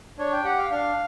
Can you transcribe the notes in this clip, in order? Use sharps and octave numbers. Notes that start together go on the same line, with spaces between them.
D4 C#5
G5
G4 F#5
F5
D4 F5